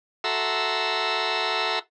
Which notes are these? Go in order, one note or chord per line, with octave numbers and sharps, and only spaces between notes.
F#4 A4 E5 A#5 C6 E6